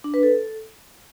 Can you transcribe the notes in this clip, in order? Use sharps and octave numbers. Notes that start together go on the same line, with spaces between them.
D4
B4
A4